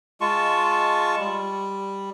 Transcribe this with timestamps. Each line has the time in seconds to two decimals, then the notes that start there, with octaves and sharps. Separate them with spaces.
0.21 G#3 F4 A5 C#6
1.19 G3